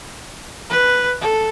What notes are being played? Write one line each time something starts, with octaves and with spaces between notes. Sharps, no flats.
B4
A4